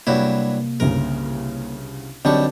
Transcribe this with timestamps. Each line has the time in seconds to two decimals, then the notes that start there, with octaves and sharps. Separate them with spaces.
0.07 G2 C3 F#3 A#3 E4
0.80 G1 C2 C#3 A#4
2.25 B1 D3 G3 C4 D4 A5 C#6